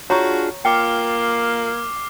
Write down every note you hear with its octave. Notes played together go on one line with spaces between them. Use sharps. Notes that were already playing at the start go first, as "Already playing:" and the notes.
D4 F4 F#4 G#4 C#5 A#5 C#6
A#3 F4 G5 D6 F6 C7